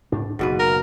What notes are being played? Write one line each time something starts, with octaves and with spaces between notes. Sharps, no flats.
G#2 D4
F#1 G#2 B2 B4
A#4